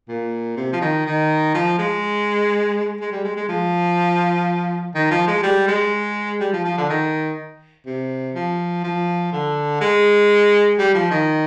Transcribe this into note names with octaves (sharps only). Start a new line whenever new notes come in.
A#2
C3
F3
D#3
D#3
F3
G#3
G#3
G3
G#3
G#3
F3
D#3
F3
G#3
G3
G#3
G3
F3
F3
D3
D#3
C3
F3
F3
D3
G#3
G3
F3
D#3